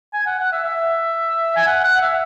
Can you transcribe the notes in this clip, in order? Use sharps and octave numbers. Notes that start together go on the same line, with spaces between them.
G#5
F#5
F#5
E5
E5
G#5
F#5
F#5
E5